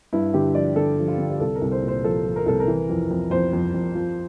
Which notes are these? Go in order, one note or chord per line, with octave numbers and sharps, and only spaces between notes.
G2 E4
D3 G4
F3 D5
D3 A4
F3
F4
D3
G4
C2 A4
A#4
C2
C5
A#2
C5
F3 A4
F3
A#4
C2 A4
A#4
E3
F2
F2
F2 C5
F2
F2
F3